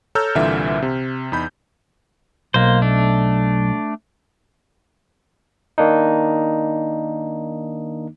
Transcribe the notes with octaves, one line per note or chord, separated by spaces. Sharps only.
A4 C#5 A#5 E6 F6 G6
C2 A#2 D3 E3 E5
C3
E2 D#4 B5 G6
B1 A#3 C5
A3 D4
D#3 A#3 D4 D#4